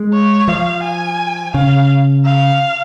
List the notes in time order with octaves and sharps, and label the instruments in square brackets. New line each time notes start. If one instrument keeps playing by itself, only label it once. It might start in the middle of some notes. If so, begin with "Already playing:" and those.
Already playing: [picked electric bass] G#3
[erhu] C#5
[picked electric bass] F3 [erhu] F5
[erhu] G#5
[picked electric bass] C#3 [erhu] F5
[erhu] F5